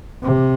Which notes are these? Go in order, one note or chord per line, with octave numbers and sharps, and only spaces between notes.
C3